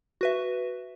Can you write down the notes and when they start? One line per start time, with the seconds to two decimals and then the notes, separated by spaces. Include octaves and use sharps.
0.21 F#4 B4 E5